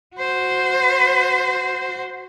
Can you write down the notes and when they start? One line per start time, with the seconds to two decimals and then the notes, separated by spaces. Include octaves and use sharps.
0.16 F#4 C5